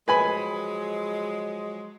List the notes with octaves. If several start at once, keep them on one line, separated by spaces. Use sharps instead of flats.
F3 F#3 G#3 B4 G#5 B5